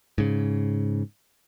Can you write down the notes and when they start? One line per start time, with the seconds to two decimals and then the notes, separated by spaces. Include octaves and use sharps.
0.18 G#2 C#3